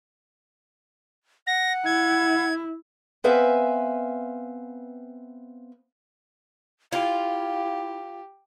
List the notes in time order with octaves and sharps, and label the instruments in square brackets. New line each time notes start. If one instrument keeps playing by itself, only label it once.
[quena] F#5 [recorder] A#6
[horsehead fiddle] E4 [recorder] G#6
[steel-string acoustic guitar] B3 C4 B4 E5 F5 G#5
[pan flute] E4 [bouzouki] F4 [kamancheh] G4 [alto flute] F5